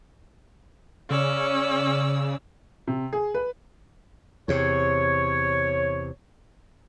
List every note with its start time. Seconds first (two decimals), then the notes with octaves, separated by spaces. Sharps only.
1.10 C#3 C#4 D5 E6
2.87 C3
3.13 G#4
3.34 B4
4.48 E2 C3 C#5